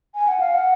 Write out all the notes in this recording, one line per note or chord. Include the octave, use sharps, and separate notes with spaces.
G#5
F#5
F5
F#5